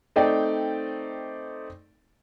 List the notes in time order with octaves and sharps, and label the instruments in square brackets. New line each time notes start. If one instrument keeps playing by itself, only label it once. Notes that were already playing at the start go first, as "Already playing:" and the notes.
[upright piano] A3 C4 D#4 D5 G5